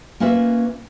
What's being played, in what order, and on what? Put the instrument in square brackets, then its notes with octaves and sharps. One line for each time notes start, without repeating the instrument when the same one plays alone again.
[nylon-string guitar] A#3 C#4 F4 B4 E5